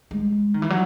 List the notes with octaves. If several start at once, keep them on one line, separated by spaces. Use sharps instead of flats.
G#3
D#3
E3
F#3